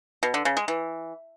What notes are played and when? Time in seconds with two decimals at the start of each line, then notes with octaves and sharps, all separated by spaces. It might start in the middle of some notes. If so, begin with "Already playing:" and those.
0.23 B2
0.34 D3
0.45 C#3
0.57 G#3
0.68 E3